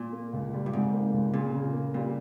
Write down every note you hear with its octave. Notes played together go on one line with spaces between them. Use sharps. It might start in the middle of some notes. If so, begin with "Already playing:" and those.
Already playing: A#2
A#3
C#2
G3
G2
G#2 C3
A#3
C#2
A#2 C#3
C#3
A#3
A#2 G3